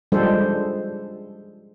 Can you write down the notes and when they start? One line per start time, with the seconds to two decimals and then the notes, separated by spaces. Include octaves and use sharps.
0.12 F3 G3 G#3 D4 A4 C5